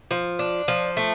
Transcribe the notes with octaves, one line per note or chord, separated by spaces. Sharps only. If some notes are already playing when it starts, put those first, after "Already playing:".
F3
D4
F3
A3